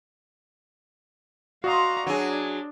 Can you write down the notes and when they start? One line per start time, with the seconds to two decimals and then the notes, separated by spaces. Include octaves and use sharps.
1.64 F#4 D5 D#5 F5 A#5 C6
2.07 F#3 D4 G#4